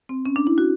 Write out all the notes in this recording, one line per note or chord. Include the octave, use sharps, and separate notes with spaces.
C4
C#4
D4
E4
F#4